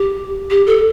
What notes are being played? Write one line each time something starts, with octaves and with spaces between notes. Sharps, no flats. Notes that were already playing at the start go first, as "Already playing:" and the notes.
Already playing: G4
G4
A4